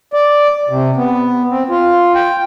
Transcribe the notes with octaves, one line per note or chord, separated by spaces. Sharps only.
D5
C3
B3
C4
F4
G5